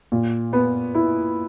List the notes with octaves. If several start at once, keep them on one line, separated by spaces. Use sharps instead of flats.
A#2
B3
E4